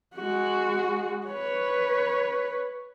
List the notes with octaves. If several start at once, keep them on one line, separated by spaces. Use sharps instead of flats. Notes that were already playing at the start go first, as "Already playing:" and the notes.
G#3 F#4
B4 C#5